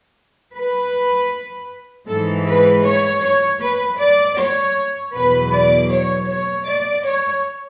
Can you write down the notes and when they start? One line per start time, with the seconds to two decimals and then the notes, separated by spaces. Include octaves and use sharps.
0.55 B4
2.08 G#2 E3 A4
2.46 B4
2.84 C#5
3.22 C#5
3.60 B4
3.99 D5
4.36 C#5
5.12 E2 B2 F#3 B4
5.51 D5
5.89 C#5
6.27 C#5
6.66 D5
7.04 C#5